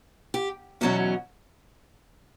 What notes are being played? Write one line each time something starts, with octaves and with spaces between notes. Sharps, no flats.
G4
E2 B2 F#3 C#4 F#4